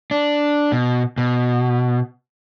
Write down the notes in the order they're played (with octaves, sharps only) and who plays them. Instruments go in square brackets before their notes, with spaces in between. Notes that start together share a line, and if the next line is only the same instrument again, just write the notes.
[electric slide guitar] D4
B2
B2